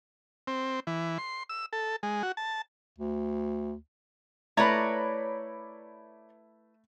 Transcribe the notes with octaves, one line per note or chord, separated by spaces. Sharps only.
C4
E3
C6
E6
A4
G#3
F#4
A5
D2
A3 E4 B4 C#5 D5 A#5 B5